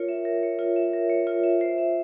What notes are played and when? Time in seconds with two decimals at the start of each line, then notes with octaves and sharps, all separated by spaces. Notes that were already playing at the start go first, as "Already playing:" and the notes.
Already playing: F4 A#4 C#5
0.09 E5
0.25 A#4
0.43 C#5
0.59 F4
0.76 E5
0.93 A#4
1.10 C#5
1.27 F4
1.43 E5
1.61 C5
1.78 E5